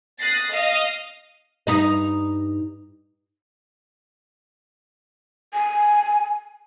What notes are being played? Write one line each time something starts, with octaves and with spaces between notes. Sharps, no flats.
D#6 F#6 A6 A#6 C7
D#5 F5 D#6
G2 D#4 D#5
G#5